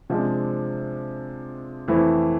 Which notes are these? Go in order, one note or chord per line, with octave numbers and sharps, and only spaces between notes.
C3 F3 G#3 D4
F2 E3 A3 E4